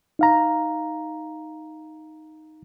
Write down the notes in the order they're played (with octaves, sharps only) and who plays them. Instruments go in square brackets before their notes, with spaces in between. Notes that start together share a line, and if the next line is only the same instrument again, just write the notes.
[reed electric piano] D#4 F5 A#5